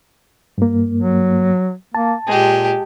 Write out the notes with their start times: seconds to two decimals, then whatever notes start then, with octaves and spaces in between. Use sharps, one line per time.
0.58 G2 A#3
0.99 F#3
1.95 A#3 A5
2.27 A#2 G#3 G4